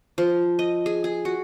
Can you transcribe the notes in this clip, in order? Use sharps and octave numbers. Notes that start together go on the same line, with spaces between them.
F3
D#5
G#4
G#4
F#4